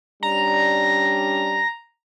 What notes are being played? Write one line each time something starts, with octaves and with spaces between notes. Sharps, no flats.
G3 C#4 D4 A#5